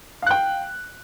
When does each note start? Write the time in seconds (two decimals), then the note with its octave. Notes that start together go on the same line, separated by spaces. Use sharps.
0.22 F5
0.26 F#6
0.31 G5